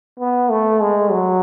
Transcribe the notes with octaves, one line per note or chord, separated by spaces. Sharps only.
B3
A3
G#3
F#3